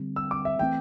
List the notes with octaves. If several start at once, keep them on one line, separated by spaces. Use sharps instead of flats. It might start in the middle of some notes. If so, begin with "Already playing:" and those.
Already playing: D3 G3 C4
E6
D6
E5
E3 A3 C4 G5